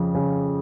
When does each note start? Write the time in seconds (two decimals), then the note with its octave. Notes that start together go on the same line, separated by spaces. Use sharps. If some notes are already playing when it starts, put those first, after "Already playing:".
Already playing: F2 C#3 F3
0.14 C#3